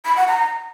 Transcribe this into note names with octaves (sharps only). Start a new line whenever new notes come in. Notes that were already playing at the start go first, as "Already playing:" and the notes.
B5
F#5
A#5